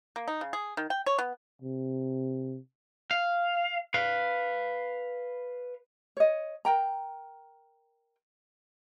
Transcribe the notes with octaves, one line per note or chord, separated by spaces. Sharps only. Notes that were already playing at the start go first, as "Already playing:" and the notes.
A#3
D#4
C#3
G#4
D#3
G5
C#5
B3
C3
F5
B4 F5
C#5 D#5
A#4 G5 A#5